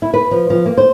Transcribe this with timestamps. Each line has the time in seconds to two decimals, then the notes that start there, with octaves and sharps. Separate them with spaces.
0.02 E4
0.14 B4
0.31 F3
0.50 F3
0.66 A#3
0.78 C5